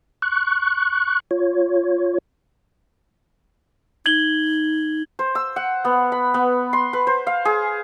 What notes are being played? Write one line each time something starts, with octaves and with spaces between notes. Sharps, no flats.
C#6 F#6
F4 C#5
D#4 G#6 F#7 G7
C5
E6
F#5
B3
B5
B3
C6
B4
C5
F5
G#4